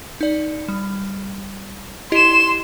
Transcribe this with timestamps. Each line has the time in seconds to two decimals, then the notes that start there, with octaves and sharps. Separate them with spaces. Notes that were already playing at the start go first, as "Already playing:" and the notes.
0.21 D#4 D5
0.68 G3
2.12 E4 G4 D#5 C6 E7